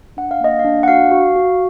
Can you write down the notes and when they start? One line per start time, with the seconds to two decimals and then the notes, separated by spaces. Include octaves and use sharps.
0.17 D4 F#5
0.31 F5
0.40 A#3 D#5
0.59 F5
0.64 D4
0.83 F#5
0.88 F#4 F5
1.11 F#4
1.36 F#4